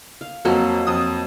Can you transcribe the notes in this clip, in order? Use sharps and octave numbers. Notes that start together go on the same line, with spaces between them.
F5
F2 F3 F#3 A#3
F2 D#6